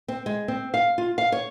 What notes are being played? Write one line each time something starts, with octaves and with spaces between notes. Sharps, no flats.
C4
G#3
C4
F5
F4
F5
C#5